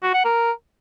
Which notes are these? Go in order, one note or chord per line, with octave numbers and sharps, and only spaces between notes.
F#4
F#5
A#4